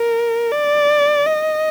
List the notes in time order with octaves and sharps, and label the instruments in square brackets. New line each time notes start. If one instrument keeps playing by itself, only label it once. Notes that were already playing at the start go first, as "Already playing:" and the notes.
Already playing: [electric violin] A#4
D5
D#5